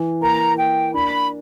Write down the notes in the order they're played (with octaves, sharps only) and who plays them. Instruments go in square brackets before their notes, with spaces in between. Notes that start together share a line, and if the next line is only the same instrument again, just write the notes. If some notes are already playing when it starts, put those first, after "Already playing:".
Already playing: [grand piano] E3
[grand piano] A#3 [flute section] A#5
[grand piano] A#3 [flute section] G5
[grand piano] D4 [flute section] B5